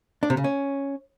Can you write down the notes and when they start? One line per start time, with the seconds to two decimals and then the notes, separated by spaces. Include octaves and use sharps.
0.23 D4
0.30 C3
0.37 C#3
0.44 C#4